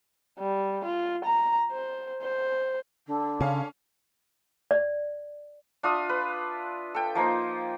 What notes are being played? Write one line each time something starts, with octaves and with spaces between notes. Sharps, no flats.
G3
F4
A#5
C5
C5
D3
C#3 C#4 F5
D5
D4 F4 E5 D#6
B4
A4 G5
F3 A#3 D#4 C5